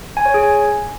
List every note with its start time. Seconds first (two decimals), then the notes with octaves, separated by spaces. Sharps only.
0.17 G#5
0.26 C#5
0.34 G#4
0.43 G#5